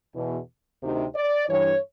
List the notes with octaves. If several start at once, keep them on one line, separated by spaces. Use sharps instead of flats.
E2 B2
D2 C3 D#3
D5
G2 E3 C#5